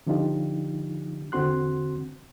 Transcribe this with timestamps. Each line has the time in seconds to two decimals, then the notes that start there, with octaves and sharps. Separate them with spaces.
0.07 D3 F3 D4 D#4 F4 G4
1.32 E2 D3 C4 F#4 C6 F#6